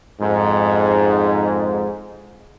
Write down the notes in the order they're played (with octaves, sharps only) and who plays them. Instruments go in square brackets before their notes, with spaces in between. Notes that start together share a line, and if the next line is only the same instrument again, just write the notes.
[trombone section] F2 G#2